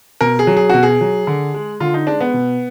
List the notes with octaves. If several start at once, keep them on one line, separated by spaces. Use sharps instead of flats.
B2 A#4
G#4
F#3
G#4
B2 F#4
G#4
F#3
D3
G#3
D3 F4
D#4
G#3 D4
B3
B2